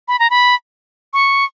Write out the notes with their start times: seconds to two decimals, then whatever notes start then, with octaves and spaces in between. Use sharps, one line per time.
0.08 B5
0.19 A#5
0.30 B5
1.13 C#6